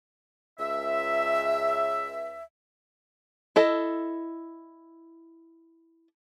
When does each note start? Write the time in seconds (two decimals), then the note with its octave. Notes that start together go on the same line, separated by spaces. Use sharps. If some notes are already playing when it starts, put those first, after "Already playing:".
0.59 C#2 E5
3.56 E4 A4 D#5